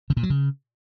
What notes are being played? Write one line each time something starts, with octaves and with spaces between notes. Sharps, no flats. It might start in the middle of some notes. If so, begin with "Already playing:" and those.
C#3
A#2
F#3
C#3